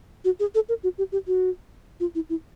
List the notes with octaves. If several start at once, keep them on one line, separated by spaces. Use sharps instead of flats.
F#4
G#4
A4
A#4
F#4
G4
G4
F#4
F4
E4
E4